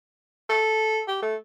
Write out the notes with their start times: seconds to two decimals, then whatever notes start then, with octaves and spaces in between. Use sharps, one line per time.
0.50 A4
1.08 G4
1.22 A3